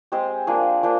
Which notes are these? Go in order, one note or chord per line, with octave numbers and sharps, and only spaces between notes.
G#3 C4 G4 C5
F3 A#3 D4 G#4
F3 A#3 D4